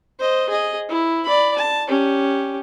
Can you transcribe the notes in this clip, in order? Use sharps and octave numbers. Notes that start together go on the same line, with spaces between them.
C5 D#5
G#4 D#5
E4
D5 B5
A5
C#4 G4